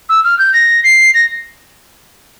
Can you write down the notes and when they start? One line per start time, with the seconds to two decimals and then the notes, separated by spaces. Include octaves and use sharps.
0.09 E6
0.24 F6
0.38 G6
0.53 A#6
0.83 C7
1.14 A#6